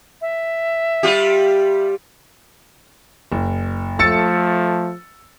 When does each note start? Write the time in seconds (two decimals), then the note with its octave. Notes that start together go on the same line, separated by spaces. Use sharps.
0.21 E5
1.03 G3 F4 G4
3.32 F#1
3.99 F3 A3 E6 A6 C#7